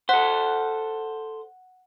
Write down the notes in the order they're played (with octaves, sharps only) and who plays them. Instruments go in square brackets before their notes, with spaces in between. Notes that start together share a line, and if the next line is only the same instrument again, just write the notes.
[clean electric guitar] A4 C5 [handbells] F#5 F#6